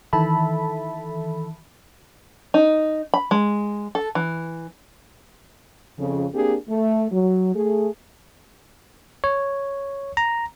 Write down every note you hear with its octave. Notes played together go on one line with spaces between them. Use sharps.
D#3 E3 A4 E5 A5 B5
D#4
B5
G#3
A4
E3
F2 C#3
A#3 C4 D4 G4 G#4
A3
F#3
A3 G#4
C#5
A#5